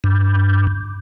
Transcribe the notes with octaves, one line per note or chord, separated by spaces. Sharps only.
G2